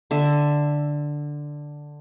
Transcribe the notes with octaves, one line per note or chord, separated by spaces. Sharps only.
D3 E5